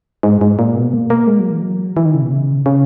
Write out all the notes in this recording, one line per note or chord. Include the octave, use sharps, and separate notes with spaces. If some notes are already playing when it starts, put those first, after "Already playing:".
G#2
G#2
A#2
B2
A#3
A#3
G#3
F#3
E3
F#3
E3
D#3
C#3
B2
C#3
C#3